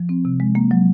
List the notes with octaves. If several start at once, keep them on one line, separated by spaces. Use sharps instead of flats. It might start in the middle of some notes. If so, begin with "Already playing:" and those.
Already playing: F3
C4
C3
G#3
A#3
F#3